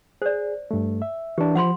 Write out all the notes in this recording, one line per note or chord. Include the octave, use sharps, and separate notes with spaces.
G#4 C5 D5
G2 A3
E5
E3 D4 G4
F3 F#5 B5 C6